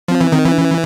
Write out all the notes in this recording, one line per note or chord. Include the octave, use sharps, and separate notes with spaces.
F3 C4
E3
D#3 C4
E3
D4
C#4